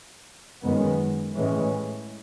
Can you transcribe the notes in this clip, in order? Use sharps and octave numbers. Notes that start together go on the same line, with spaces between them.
F#2 D#3 G#3 B3
A2 E3 G#3 C#4